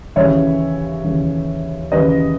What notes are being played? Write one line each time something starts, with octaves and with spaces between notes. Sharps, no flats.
D#2 C#3 E3 C#5 E5
D#2 C#3 E3
D#2 C#3 E3 B4 D#5